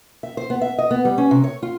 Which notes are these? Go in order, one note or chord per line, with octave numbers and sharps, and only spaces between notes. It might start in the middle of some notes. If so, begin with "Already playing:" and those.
E5
C5
B3
E5
D#5
B3
G3
C#4
C3
C#5
F4